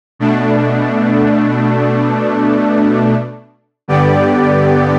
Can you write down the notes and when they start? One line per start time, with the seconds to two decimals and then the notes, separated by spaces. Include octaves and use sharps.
0.19 B2 A3 D4
3.88 G2 D3 B3 G4 D5